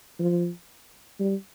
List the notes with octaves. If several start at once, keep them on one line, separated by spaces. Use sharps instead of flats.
F3
G3